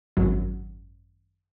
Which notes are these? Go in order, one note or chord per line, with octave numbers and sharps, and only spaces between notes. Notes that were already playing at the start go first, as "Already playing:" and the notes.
G#1 F#2 F#3